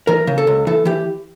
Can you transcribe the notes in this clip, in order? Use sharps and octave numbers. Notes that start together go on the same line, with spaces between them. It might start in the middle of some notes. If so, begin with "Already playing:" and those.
E3 A#4
C#3
A4
C#2
E3 A4
E3 G4